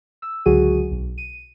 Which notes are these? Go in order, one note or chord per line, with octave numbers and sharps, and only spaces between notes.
E6
C#2 D3 F#3 F#4 G#4 D#7
B1
D#7